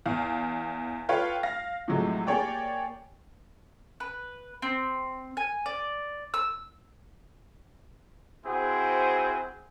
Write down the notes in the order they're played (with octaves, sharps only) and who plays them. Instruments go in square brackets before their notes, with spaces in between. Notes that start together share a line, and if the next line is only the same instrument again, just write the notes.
[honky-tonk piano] E2 F5
F4 A4 B4 C#5 F5 G5
F5 A#6
A2 C3 F3 F#3 G#3 A3
A#3 G4 G#4 C#5 D5 G5
[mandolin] B4
C4
G#5
D5
E6
[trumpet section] C4 E4 F#4 G#4 C5